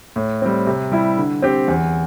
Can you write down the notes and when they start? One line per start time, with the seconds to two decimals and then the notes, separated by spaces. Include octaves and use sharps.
0.16 A2
0.42 G3 C4
0.67 C3
0.92 G3 E4
1.17 D3
1.42 C4 G4
1.68 E2